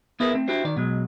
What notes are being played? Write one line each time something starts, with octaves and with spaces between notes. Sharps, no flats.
B3 E4 G#4 A#4 B4
A3 C4
D4 E4 F#4 G4 C5
D#3 D5
B2 F#3 G#3